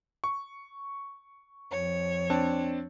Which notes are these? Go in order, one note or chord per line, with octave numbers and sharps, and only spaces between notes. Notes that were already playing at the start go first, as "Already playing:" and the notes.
C#6
F2 C#5
C4 D4 A5